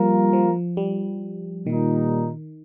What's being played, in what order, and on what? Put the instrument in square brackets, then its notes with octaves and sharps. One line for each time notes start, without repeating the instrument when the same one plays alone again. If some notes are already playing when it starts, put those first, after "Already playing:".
Already playing: [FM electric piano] F3 [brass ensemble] G3 A#3 F4 A#4
[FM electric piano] F3
G3
[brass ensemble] A#2 G3 D#4 [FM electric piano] D#3